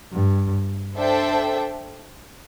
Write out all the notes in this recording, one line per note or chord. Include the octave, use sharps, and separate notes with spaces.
G2
D4 A4 C5 E5 G5